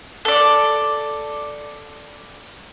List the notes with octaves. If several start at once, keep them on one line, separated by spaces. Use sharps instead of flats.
A4 D5